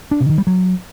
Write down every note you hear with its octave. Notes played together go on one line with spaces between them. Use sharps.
D4
C3
D#3
G3
F#3